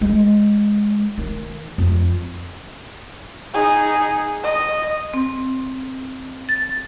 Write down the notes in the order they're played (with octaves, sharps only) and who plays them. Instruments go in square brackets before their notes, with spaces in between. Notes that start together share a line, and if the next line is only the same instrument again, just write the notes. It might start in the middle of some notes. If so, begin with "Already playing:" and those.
[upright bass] G#3
D#3
F2
[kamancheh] D#4 G#4
D#5
[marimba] C4
A6